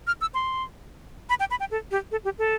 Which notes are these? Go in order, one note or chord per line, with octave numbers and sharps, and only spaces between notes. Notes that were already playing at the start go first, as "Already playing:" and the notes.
F6
E6
C6
B5
G5
B5
G5
A4
G4
A4
G4
A4